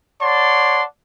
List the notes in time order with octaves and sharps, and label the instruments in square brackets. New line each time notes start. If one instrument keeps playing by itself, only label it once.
[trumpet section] C#5 D5 F#5 A5 C6